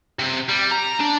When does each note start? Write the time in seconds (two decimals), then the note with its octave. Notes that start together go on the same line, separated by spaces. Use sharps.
0.19 C3
0.49 G3
0.71 A#5
1.00 D4